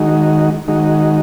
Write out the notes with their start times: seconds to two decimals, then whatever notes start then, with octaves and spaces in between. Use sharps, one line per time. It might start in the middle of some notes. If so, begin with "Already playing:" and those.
Already playing: D#3 G#3 D#4 F#4
0.68 D#3 G#3 D#4 F#4